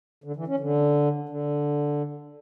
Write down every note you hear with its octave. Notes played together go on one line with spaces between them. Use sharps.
D3
E3
C#4
D3
D3